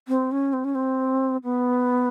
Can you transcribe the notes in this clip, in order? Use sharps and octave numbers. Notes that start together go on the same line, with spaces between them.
C4
C#4
C4
C#4
C4
B3